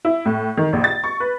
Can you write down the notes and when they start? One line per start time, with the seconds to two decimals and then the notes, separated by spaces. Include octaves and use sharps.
0.05 E4
0.25 A2
0.57 D#3
0.73 A#1
0.84 A6
1.04 C#6
1.20 B4